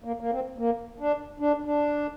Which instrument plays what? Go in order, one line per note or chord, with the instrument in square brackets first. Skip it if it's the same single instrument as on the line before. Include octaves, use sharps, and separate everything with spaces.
[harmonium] A#3
A#3
C4
A#3
D4
D4
D4